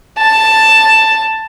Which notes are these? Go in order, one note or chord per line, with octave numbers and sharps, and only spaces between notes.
A5